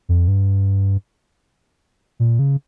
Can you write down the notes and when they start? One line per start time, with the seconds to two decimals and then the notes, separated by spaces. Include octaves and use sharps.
0.09 F2
0.28 G2
2.20 A#2
2.39 C#3